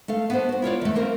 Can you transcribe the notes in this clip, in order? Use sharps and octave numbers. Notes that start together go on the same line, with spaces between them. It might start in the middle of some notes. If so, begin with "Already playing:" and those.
A3 A4 F5
B3 D4 C5
F#4 C5
E4 F4 C#5 D5
E2 A3
A#3 C4 A#4